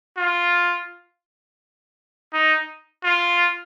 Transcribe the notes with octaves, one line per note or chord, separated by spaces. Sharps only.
F4
D#4
F4